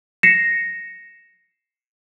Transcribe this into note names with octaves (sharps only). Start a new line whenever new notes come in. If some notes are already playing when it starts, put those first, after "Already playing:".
A#6 C7 C#7 E7